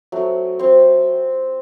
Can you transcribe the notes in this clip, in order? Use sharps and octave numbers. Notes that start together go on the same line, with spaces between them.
F#3 A3 C4
C4 C5